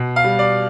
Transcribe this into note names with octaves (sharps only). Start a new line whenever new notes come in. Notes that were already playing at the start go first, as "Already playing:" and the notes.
Already playing: B2
F5
G3
D5